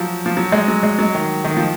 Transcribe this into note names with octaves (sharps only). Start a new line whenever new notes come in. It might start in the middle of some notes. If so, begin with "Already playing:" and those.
Already playing: F3 F#3
F3
F#3
G#3
F#3
G#3
F#3
D#3
D#3
F3